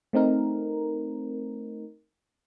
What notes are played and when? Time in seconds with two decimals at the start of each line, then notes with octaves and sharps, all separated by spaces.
0.13 A3 C4 D#4 A#4